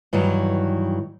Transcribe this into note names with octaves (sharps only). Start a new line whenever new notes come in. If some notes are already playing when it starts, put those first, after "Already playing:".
G2 D#3 E3 F#3